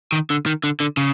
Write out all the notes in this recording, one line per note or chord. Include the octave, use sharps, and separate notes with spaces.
D#3
D3
D#3
D3
D3
C#3